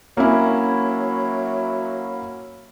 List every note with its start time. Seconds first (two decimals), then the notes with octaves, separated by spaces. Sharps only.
0.17 F#3 A#3 C#4 E4